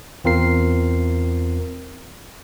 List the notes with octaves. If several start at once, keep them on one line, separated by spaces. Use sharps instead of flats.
E2 C4 F4 A#4 C7